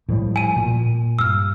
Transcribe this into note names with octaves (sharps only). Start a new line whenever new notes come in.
A2 F3 G3
G#5 D#7
A#2
G2 E6 F6